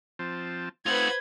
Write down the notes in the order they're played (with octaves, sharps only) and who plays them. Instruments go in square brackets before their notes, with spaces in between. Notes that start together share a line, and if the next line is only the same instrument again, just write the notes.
[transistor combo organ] F3 C4 A5
[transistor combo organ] A3 C4 D#4 [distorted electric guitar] F4 F#5 [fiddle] B4 C5 [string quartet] G#6